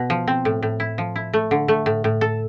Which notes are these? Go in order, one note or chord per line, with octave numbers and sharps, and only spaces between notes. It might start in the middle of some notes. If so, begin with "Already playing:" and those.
Already playing: B2
F3
C4
A2
A2
E4
F3
E4
A3
D3
A3
A2
A2
A4